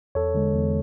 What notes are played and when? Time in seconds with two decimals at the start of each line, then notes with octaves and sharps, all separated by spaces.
0.15 E2 A4 C#5
0.35 D3 G#3
0.54 E2